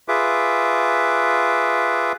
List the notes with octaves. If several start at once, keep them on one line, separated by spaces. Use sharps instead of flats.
F4 G#4 B4 E5 D6